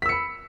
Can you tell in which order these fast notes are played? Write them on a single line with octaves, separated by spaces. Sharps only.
B6 E6 C#7 B5